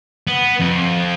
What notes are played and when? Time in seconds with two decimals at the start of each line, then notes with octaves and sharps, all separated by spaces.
0.27 B3
0.60 F2